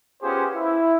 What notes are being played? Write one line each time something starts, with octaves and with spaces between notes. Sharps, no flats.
B3 C#4 F4 G4 G#4 C5
E4